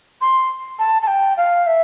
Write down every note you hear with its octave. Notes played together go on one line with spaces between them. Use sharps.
C6
A5
A5
G5
F5
E5